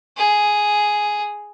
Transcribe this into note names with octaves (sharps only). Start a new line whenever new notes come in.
G#4